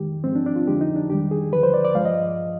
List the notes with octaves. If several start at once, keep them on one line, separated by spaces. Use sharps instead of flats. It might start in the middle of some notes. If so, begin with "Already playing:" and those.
Already playing: F2 D#3 G#3 G4
G#2 F3 G#3 C4
D4
D4
F4
F2 D3 F3 G#3 G4
D#4
D4
F2 D#3 G3 G4
G#4
D#2 D3 F3 B4
C5
D5
D5
G2 F3 G#3 F5
D#5